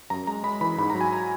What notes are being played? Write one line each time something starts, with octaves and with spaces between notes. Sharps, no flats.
F#2 A#5
G#3 A#5
G#3 B5
E3 B5
G#2 B5
F#3 A#5
G#5
A#5